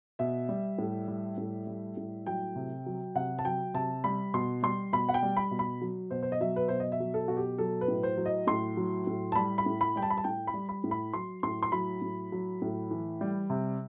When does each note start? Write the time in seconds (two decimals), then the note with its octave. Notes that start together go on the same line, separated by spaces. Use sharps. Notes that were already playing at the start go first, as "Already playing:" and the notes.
0.19 B2 E5
0.49 G3
0.78 A2
1.08 G3
1.37 A2
1.67 G3
1.97 A2
2.26 F#3 G5
2.56 C3
2.86 F#3
3.15 C3 F#5
3.39 A5
3.45 F#3 G5
3.74 C3 A5
4.04 G3 B5
4.34 B2 C6
4.63 G3 C6
4.93 B2 B5
5.09 F#5
5.14 G5
5.23 G3
5.37 B5
5.51 B2
5.59 B5
5.81 F#3
6.11 B2 C5
6.23 C5
6.32 D#5
6.41 F#3 E5
6.56 B4
6.68 B2 C5
6.80 D#5
6.92 E5
7.00 F#3
7.14 A4
7.28 B2 F#4
7.37 G4
7.58 F#3 A4
7.81 B4
7.88 A2
8.03 C5
8.17 F#3
8.26 D#5
8.47 A2 C6
8.77 F#3
9.07 A2
9.32 A5
9.35 G3 B5
9.58 B5
9.66 A2
9.81 B5
9.96 G3 G5
10.02 A5
10.10 B5
10.17 A5
10.24 A2 G5
10.47 B5
10.54 G3
10.69 B5
10.84 A2
10.91 B5
11.13 F#3 C6
11.43 A2 C6
11.63 C6
11.72 F#3 B5
12.02 A2
12.32 F#3
12.62 A2
12.91 E3
13.21 G3
13.50 C3